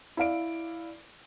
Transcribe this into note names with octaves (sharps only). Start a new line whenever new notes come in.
E4 D5 F5 D7